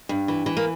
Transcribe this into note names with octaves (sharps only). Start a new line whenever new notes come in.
G2
E3
E3
A#3